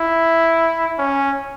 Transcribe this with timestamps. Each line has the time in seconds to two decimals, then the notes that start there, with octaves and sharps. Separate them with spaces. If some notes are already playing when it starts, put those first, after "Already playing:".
Already playing: E4
0.98 C#4